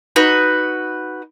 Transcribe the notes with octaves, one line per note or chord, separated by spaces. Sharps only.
D#4 F#4 B4